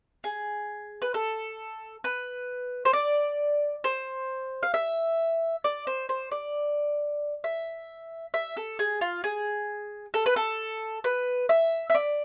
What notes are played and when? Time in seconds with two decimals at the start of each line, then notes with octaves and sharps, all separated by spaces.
0.24 G#4
1.02 B4
1.14 A4
2.04 B4
2.85 C5
2.93 D5
3.84 C5
4.63 F5
4.74 E5
5.64 D5
5.87 C5
6.09 C5
6.32 D5
7.44 E5
8.34 E5
8.57 A4
8.79 G#4
9.01 F4
9.24 G#4
10.14 A4
10.26 B4
10.36 A4
11.04 B4
11.49 E5
11.90 E5
11.95 D5